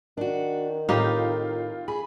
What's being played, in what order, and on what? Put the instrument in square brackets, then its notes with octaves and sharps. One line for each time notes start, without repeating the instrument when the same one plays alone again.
[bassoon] D#3 [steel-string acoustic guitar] D4 F#4
[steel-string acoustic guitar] A2 [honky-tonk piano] C4 F4 F5 [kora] D#4 G4
[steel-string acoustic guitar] G#4 [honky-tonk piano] B5